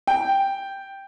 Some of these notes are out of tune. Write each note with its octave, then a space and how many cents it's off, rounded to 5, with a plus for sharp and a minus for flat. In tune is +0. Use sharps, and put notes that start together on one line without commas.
G5 +0